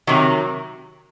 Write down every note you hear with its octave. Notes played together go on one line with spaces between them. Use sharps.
C3 D#3 F#3